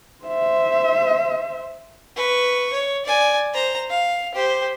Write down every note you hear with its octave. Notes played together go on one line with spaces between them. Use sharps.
C5 E5
B4 C#6
C#5
D5 G#5
C5 A#5
F5
G4 C5